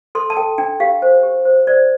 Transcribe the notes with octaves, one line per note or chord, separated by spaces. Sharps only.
A4 C6
A5
A4 G5
D4 G5
G4 F5
C5
G4
C5
C5 D5